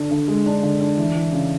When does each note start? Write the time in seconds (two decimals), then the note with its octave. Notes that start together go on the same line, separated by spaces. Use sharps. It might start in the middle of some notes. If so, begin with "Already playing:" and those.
Already playing: D3 D4 A4
0.11 D3
0.28 G#3
0.46 D4
0.63 D3
0.81 D4
0.98 E3
1.15 E3
1.32 C#3